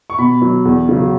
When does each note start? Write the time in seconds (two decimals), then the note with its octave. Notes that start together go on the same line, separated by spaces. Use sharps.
0.10 C#6
0.18 B2 B5
0.42 F#3
0.65 E2
0.89 C#3 F#3